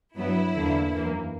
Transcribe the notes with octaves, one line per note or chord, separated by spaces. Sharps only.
G2 F#3 B3 E4
E2 D3 A#3
F#2 E3 A#3